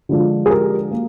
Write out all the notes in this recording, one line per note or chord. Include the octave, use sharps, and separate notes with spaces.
D3 F3 G#3 D4 F4
G#4
G4 A#4
A#3